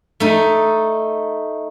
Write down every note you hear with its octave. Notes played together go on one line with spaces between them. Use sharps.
A3 D#4